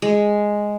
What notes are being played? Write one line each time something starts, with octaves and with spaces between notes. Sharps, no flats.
G#3